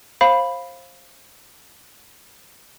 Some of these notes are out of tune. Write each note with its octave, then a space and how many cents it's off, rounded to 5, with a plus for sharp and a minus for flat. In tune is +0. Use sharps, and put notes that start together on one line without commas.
C5 +25 F5 +5 B5 +0